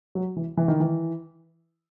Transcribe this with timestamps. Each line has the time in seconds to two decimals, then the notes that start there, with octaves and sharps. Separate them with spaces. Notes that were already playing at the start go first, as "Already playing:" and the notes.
0.15 F#3
0.36 E3
0.57 E3
0.68 D#3
0.80 E3